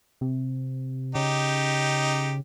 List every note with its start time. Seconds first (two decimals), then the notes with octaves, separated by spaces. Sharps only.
0.21 C3
1.15 C#3 D#4 G4